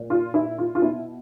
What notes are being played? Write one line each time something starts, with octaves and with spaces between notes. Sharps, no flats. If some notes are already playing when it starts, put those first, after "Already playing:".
Already playing: A#2
F4
E4
F4
F4
B2 E4